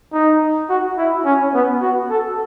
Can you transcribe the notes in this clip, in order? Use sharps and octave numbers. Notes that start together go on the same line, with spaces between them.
D#4
F#4
E4
C#4
B3
F#4
A4